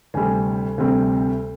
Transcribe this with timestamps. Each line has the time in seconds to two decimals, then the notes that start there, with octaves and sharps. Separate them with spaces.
0.14 D2 C3 G3 C4 G#5
0.78 D2 C3 G3 C4